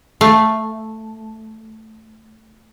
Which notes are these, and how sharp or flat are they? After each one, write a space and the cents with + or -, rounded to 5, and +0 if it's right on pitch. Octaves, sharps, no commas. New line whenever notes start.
A3 +0 F5 +0